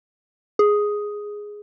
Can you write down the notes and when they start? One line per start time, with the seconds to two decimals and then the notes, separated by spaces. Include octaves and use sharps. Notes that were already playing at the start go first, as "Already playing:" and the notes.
0.59 G#4